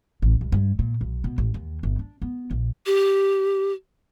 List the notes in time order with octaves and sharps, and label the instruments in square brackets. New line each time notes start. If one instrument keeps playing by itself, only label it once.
[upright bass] A1
C2
G2
A#2
B1
B2
A1
D#2
G1
D4
B3
A#1
[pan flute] G4